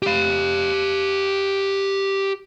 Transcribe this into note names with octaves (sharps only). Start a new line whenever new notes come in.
G4 F5